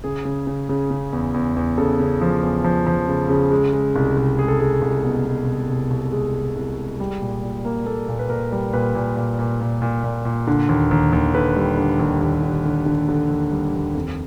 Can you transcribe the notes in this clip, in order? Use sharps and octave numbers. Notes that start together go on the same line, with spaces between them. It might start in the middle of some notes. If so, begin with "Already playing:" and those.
C#3 G#4
C#3
C#3
C#3
C#3
E2
E2
E2
C#3 A4
C#3
F3
E2
F3
F3
C#3
C#3
G#3
G#3
C2
C2
G#3 G#4
A4
G#3 G#4
C2
B2
B2
C2
C2
C2
G#3 G#4
G#3
C2
G#3
G3
A#2
A#2
A#3
A#3 A4
A#2
B4
A#2 A#4
G3
A#2 B4
A#2
A#2
A#2
A#2
A#2
A#2
A#2
D3
D#2
D#2
D#2
D3 B4
G3
D3
D#2
D#2
D3
D3
D3
D3
D#2
G3
D#2
F2